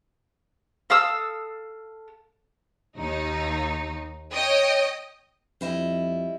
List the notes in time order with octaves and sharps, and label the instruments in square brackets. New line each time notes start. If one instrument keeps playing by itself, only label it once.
[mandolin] A4 F5 D#6 E6
[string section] D#2 D#4
C#5 D#5 G5 D#6
[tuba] F2 [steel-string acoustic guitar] G3 E4 D#5